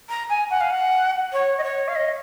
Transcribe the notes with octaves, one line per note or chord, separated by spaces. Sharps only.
A#5
G#5
F#5
F5
F#5
C#5
D#5
C#5
F5
D#5